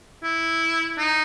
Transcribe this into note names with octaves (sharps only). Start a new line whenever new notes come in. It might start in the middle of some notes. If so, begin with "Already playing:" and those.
E4
D#4